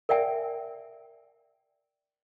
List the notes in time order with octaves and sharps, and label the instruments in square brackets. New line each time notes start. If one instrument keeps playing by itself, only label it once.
[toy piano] A#4 D5 E5 G5 G#5